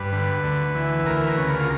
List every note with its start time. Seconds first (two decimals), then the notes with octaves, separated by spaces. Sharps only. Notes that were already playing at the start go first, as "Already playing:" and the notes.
Already playing: G2 B4
0.12 D3
0.44 D2
0.75 E3
1.06 D2 A#4
1.27 B4
1.37 C#3
1.47 A#4
1.60 F4